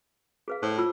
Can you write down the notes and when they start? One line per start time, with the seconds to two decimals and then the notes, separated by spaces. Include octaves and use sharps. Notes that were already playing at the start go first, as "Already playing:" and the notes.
0.48 G#4 B4 F5
0.62 A2 C5
0.78 F4 E6